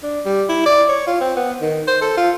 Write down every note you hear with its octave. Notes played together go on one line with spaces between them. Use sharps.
D4
G3
E4
D5
C#5
F4
C4
B3
D#3
C5
A4
F4